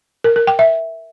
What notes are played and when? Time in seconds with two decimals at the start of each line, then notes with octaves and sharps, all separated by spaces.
0.24 A#4
0.36 A#4
0.47 G5
0.59 E5